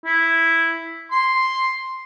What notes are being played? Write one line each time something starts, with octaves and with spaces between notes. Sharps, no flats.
E4
C6